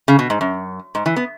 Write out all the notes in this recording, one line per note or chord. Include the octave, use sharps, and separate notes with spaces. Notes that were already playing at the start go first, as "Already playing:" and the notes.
C#3
B2
G#2
F#2
G#2
E3
B3